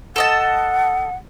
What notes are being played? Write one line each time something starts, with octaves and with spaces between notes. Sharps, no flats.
A4 D#5 F#5 A5